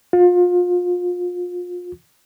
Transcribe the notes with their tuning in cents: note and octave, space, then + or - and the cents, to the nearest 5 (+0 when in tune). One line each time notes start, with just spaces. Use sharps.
F4 +30